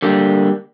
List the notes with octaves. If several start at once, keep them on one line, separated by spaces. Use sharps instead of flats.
D3 G3 A#3